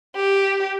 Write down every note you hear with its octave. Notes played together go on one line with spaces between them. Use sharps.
G4